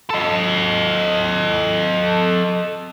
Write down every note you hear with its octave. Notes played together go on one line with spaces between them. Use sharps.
A4 D#5